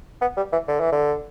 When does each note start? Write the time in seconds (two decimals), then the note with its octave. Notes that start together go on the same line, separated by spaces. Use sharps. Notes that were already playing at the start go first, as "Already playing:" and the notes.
0.21 B3
0.37 G3
0.53 E3
0.68 D3
0.80 E3
0.92 D3